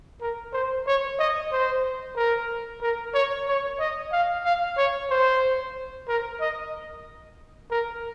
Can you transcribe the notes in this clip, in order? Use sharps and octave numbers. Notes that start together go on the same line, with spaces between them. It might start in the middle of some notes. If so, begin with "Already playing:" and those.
A#4
C5
C#5
D#5
C5
A#4
A#4
C#5
C#5
D#5
F5
F5
C#5
C5
A#4
D#5
A#4